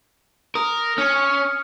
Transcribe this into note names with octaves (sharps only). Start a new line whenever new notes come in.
A#4 D#6
C#4 F6 C#7